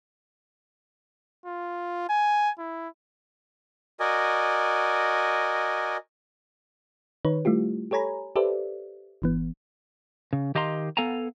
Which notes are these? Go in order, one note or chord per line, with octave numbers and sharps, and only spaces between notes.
F4
G#5
E4
F#4 A#4 D5 D#5 G#5
D#3 D#4 B4 C#5
G3 A3 E4 F4 G4
G4 A4 C#5 G#5 A#5 B5
G4 A4 B4 C5 D5 E5
G1 E3 B3
C#3
D#3 G4 D#5 F5 A#5 C6
B3 A4 F5 F#5 G#5 A#5